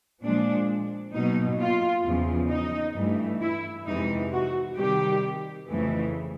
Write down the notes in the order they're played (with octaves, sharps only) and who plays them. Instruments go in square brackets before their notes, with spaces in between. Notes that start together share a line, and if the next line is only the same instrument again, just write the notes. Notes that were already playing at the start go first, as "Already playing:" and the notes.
[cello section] A#2 F3 G#3 D4
B2 F#3 A#3 D#4
F4
E2 C#3 F3
D#4
G2 E3 A3
E4
F2 C3 E3 G#3 D#4
F#4
C3 D#3 G3 G4
F2 C#3 E3 A3